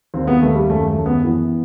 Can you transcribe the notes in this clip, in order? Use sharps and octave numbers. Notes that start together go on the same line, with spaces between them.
D#2 C4
B3
D#2 A3
G3
F#2 A3
A3
F#2
B3
E3 B3